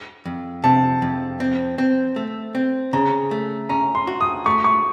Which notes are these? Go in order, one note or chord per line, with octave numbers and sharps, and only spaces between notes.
F2
C3 A5
F2
C4
C4
A3
C4
C#3 A#5
A3
C#4 A#5
C6
F#4
D#6
A3 C#6
C#6